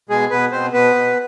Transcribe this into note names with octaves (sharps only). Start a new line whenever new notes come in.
B2 G#3 G#4
B2 B3 B4
B2 C4 C5
B2 B3 B4
B2